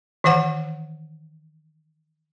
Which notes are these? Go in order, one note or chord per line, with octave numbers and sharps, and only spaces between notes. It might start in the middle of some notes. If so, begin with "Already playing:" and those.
D#3 E3 C5 F#5